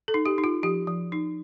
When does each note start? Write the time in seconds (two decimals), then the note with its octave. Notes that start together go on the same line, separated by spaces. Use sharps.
0.08 A4
0.14 D#4
0.26 G4
0.38 D#4
0.44 F4
0.63 F3 G4
0.87 F3
1.12 D#4